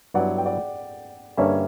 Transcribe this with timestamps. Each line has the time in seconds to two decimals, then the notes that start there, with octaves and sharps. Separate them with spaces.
0.14 G2 F#3 B3 E4 D5 F#5
0.38 G5
0.46 D5 F#5
1.37 G2 D3 A#3 C#4 C#5 E5